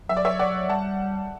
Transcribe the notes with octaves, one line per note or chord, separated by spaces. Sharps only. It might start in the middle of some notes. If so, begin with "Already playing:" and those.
F#3 E5
D5
C#5 E5
D5 F#5
G3 F#5 A5